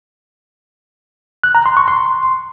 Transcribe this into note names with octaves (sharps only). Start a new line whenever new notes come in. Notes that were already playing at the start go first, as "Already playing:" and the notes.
F#6
A#5
C6
C#6
C6